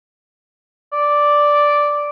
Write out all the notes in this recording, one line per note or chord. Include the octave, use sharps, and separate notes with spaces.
D5